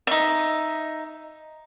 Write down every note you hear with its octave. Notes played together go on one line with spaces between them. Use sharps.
D#4 E5